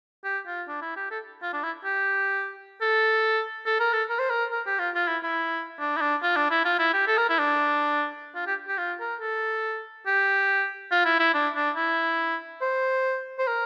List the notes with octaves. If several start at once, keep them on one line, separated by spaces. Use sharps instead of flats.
G4
F4
D4
E4
G4
A4
F4
D4
E4
G4
A4
A4
A#4
A4
A#4
C5
A#4
A#4
G4
F4
F4
E4
E4
D4
E4
D4
F4
D4
E4
F4
E4
G4
A4
A#4
E4
D4
F4
G4
G4
F4
A#4
A4
G4
F4
E4
E4
D4
D4
E4
C5
C5
A#4